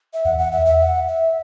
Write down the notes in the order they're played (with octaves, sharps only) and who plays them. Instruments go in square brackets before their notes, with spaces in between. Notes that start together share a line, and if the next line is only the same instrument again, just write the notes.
[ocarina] E5
[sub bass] E2 [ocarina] F#5
[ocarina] F#5
E5
E5
F#5
E5